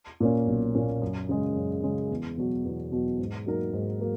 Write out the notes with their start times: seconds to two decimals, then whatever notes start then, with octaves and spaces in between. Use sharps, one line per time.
0.20 A#2 A#3 C#4
0.47 B1
0.75 A#2 A#3 C#4
1.02 F#2
1.29 C#3 G#3
1.56 F#2
1.83 C#3 G#3
2.11 E2
2.38 B2 F#3
2.65 E2
2.92 B2 F#3
3.19 G#2
3.46 F#3 A#3 D#4 A#4
3.73 G#2
4.00 F#3 A#3